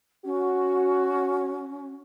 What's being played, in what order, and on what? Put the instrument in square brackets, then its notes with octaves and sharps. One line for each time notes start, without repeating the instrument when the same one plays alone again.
[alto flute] C#4 [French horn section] F#4